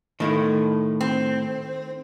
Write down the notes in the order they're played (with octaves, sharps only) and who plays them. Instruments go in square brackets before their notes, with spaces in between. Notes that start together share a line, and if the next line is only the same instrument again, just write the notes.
[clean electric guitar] A2 [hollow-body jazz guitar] D#3 A3 E4
[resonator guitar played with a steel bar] C4